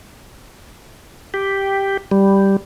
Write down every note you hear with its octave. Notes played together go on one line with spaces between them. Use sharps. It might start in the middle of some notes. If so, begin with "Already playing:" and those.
G4
G3